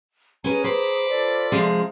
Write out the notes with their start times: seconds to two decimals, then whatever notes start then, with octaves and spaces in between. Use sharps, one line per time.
0.44 C#4 G#4 B4 A#5
0.64 C5 B5 D6
1.08 F4 A4 D5
1.52 C3 F3 G#3